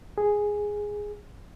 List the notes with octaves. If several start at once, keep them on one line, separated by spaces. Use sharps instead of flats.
G#4